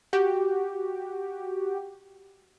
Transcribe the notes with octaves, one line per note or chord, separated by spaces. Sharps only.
F#4 G4